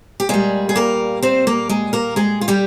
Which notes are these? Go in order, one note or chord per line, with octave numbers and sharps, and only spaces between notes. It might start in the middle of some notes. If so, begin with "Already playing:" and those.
G4
A#2 G3 G#3 G#4
G#4
A#3 A#4
C4 C5
A#3 A#4
G#3 G#4
A#3 A#4
G#3 G#4
F4
G3 G4